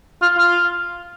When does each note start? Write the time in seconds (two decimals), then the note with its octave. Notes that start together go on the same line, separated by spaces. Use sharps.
0.22 F4
0.38 F4